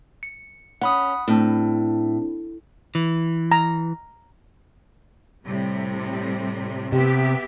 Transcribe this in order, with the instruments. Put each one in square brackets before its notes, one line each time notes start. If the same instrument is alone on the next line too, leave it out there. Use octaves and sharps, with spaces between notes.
[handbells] C#7
[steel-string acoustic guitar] C#4 [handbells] F#5 B5 D#6
[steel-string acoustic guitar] A2 [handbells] C4 D4
[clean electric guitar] E3
[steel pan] A#5
[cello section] A2 C3 G3
[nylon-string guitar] C3 [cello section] B3 G4 E5